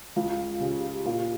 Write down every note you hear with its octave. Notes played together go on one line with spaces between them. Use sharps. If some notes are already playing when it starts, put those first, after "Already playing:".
C#2 F4
C#3 G4
A#2 F4